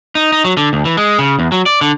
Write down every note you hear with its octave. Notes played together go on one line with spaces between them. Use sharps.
D#4
D#4
F#3
D3
D2
E3
G#3
C#3
E2
F#3
D5
D3